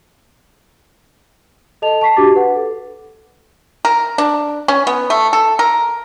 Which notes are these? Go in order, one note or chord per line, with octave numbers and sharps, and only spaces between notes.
A4 D#5 A5 F7
A5 C#6 B6 C7
D4 F#4 G4 D6 A6
B4 F#5
A4
A#4
D4
C#4
B3
A3
A4
A#4